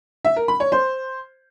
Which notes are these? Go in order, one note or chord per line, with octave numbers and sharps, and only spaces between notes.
E5
A#4
B5
C#5
C5